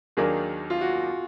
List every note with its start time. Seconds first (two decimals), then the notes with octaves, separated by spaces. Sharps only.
0.17 D#2 D#3 F#3 A#3 D4 G#4
0.70 F4
0.81 F#4